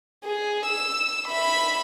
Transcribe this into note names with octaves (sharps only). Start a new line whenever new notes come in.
G#4
E6
E5 B5